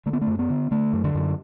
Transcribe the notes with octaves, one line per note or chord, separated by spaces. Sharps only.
D3 A3
B3
A3
F#2
B3
D3
D3 A3
F#2
D3
F#2